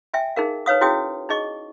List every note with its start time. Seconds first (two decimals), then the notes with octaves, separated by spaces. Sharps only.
0.14 E5 G5 G#5
0.36 D#4 G#4 A#4 F5
0.66 D#4 B4 C#5 F5 D#6
0.81 C#4 E4 F#4 G#4 G5 D#6
1.29 D#4 G#4 D#5 C#6